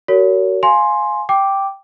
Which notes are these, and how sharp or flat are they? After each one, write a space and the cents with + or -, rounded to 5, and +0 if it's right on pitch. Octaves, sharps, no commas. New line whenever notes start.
F#4 +30 A#4 -35 C#5 +25
F5 +0 G#5 +10 C6 +10
G5 +0 D6 +0